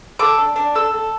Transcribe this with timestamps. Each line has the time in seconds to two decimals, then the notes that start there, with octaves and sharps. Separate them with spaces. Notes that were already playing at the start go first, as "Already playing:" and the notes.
0.19 A4 D6
0.38 D4
0.56 D4
0.75 A4 E6
0.94 A4